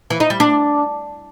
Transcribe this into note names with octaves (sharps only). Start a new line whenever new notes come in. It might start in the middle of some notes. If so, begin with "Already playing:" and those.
E3
D#4
G3
D4